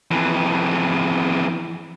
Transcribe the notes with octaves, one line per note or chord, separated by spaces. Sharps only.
F2 E3